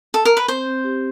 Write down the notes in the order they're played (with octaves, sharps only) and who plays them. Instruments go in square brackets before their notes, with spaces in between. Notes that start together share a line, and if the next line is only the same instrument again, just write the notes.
[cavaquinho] A4
A#4
B4
[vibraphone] C4 [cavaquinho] C5
[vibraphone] C4
G4